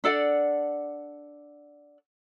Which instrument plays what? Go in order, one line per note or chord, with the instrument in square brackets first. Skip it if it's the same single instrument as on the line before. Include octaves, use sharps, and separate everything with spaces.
[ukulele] D4 A4 D5 F#5